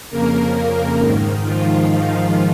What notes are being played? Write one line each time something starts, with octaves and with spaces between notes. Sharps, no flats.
F2 C#3 A#3 A#4
G#2 D#3
F3 F4
G#2 D#3 F3 F4